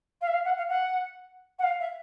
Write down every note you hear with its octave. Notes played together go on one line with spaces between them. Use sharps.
F5
E5
F5
F#5
F5
F#5
F#5
F5
E5